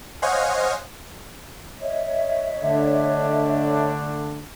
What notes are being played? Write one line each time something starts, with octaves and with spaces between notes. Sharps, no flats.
C5 C#5 D#5 F5 F#5 G#5
C#5 D#5 E5
D3 A3 D4